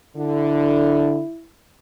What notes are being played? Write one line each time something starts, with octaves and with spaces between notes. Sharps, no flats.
D3 E4